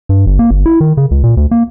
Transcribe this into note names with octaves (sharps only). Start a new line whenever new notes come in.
G2
G1
A#3
G1
E4
D#3
C#3
C#2
A#2
D2
A#3